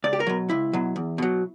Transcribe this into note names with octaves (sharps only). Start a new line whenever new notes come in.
C#2 D5
G4
A#4
B2 F#3
C#2 E4
B2 F#3
E2
B2 F#3